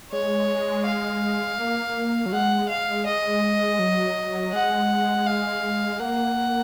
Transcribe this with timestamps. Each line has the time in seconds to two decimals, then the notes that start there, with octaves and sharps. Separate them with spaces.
0.11 G#3 C#5
0.86 F5
1.59 A#3
2.26 F#3
2.32 G#3 F#5
2.69 F5
3.06 D#5
3.79 F#3
4.53 G#3 F#5
5.26 F5
6.00 A#3 F#5